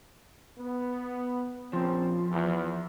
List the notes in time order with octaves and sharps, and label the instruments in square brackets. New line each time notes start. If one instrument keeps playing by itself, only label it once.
[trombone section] B3
[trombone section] A#1 C#3 C4 [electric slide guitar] F3
[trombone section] E2